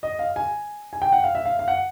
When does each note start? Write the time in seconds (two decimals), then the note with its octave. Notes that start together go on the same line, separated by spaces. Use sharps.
0.03 D#5
0.19 F5
0.36 G#5
0.93 G#5
1.02 G5
1.13 F#5
1.24 F5
1.35 E5
1.46 F5
1.59 F5
1.68 F#5